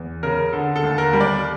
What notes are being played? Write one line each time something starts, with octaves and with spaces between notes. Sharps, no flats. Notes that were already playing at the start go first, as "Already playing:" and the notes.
Already playing: E2
C#3 A#4
D3 A4
A4
D#2
A#4
G3
D5